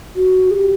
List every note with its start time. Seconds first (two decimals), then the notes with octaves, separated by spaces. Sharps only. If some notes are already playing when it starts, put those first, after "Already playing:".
0.16 F#4
0.51 G#4
0.54 G4